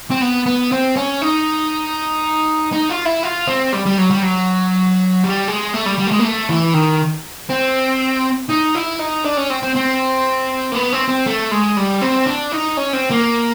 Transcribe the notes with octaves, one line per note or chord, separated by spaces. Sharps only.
C4
B3
B3
C4
C#4
D#4
D#4
F4
E4
F4
C4
G3
G3
F#3
G3
F#3
G3
G#3
A3
G3
G3
A3
G#3
A#3
A3
E3
D#3
C4
D#4
E4
D#4
D4
C#4
C4
C4
C4
A#3
B3
C4
C4
A3
G#3
G3
C4
D4
D#4
C#4
C4
A#3